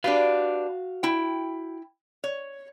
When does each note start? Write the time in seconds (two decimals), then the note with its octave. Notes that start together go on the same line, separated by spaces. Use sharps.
0.04 D4 F#4 G4 B4 F5
1.03 E4 G5
2.24 C#5